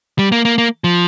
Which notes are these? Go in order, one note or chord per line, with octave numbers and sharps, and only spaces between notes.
G3
A#3
A#3
A#3
F3